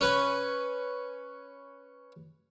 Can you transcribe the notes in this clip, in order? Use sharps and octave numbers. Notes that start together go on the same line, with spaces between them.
C#4 B4 G#5